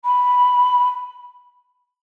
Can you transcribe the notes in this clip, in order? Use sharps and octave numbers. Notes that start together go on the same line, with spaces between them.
B5